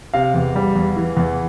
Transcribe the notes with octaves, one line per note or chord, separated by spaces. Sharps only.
C3 F5
E2
G3
E2
E3
E2